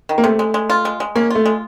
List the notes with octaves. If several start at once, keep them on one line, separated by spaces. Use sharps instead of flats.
D#3
A#3
C3 A3
G#3
G#3
F4
G#3
G#3
A#3 C#4
A3 F4
G#3